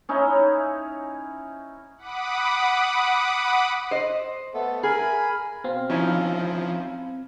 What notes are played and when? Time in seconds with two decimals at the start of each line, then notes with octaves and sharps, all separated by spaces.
0.09 C#4 D#4 E4
1.98 F#5 B5 D6 D#6
3.91 C5 D#5
4.54 A3 B3 A4
4.83 G#4 A#4 G#5 B5
5.64 B2 C4 F5
5.89 F3 C#4 D#4 E4